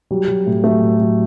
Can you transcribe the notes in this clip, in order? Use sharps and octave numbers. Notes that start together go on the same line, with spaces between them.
F#3 G3
F#3
A2
F#3 A3
A2
F#3